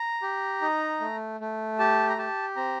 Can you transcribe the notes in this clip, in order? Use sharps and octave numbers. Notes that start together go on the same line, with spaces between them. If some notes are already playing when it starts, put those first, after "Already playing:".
Already playing: A#5
G4
D#4
A3
A3
G4 A5
A#5
G4 A5
C4 A#5